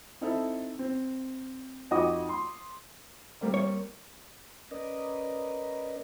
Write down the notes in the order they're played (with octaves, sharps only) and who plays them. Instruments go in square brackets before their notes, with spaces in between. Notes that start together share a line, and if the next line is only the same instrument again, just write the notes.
[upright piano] C4 D#4 E4 A4
C4
F2 D#4 F#4 D#5 D6 D#6
C6
[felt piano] G3 A#3 C4
[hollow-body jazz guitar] C#5
[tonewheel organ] C#4 A#4 B4 D5 D#5